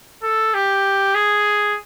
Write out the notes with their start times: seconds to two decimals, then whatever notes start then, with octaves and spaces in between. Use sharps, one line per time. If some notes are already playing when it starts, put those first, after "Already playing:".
0.23 A4
0.54 G4
1.15 G#4